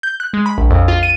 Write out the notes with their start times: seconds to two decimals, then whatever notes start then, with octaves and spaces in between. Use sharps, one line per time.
0.03 G6
0.20 F#6
0.33 G#3
0.46 B5
0.58 A#1
0.70 F2
0.88 F4
1.03 D#7